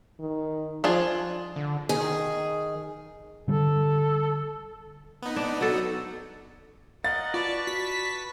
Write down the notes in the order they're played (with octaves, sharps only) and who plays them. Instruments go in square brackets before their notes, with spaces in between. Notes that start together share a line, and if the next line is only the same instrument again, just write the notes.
[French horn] D#3
[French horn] F3 [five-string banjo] D4 F4 G#4
[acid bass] D3
[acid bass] D#3 [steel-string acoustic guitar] G#4
[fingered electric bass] D3 G3 [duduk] A4
[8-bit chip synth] B3 D#4
[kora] D4
F#3 A4
[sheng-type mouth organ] A#4 D#5 F#5 [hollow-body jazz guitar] F5 [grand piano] A6
[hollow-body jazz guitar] F4 [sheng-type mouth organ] B4 A5 C#6 [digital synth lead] D5
[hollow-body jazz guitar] F#4 [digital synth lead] B6